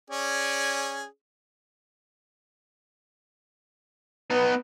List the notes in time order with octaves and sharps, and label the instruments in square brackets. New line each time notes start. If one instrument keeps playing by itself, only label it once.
[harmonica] C#4 G#4 D5
[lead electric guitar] B3 D#4 [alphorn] B4